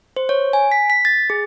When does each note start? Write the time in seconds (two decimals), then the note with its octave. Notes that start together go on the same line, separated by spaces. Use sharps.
0.17 C5
0.29 C#5
0.53 G#5
0.72 B6
0.90 B6
1.05 A6
1.30 G#4